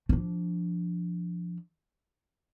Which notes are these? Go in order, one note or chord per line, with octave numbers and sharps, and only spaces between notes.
F3 D4